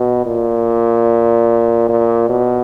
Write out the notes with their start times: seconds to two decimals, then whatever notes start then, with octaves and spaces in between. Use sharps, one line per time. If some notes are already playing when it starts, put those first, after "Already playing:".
Already playing: B2
0.26 A#2
1.89 A#2
2.30 B2